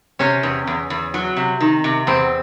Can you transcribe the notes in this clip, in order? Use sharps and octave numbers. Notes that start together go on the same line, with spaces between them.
C3 C#4
E2
E2
E2
F#3
C3
D#3
C3
E2 C4